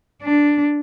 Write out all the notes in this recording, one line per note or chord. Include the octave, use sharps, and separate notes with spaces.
D4